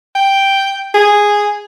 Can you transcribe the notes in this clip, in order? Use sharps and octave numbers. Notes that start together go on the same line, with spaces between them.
G5
G#4